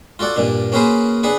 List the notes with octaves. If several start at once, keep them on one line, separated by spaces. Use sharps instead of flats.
F4 F#4 A4 D5 F#5
G2 A#2 A#3 D4
A#3 C#4 F#4 G#4 B4 C5
D4 G#4 B4 F#5